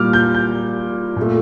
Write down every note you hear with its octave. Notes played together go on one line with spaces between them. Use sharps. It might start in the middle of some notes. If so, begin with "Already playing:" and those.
Already playing: A#2 G3 A#3 D6 F6
G6
G6
A#2 A3